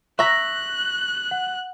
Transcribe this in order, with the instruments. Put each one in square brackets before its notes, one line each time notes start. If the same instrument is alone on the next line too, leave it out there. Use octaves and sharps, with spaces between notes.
[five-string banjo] E5 A#5 [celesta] C#6 A#6 B6 [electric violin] F#6
[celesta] F#5